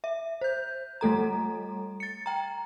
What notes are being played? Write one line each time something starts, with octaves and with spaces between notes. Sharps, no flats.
E5
C5 G6
G3 A3 A4 A#5
A6 C#7
G5 A#5